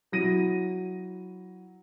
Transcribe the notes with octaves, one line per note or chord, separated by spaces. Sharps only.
F#3 E4 A#6 D#7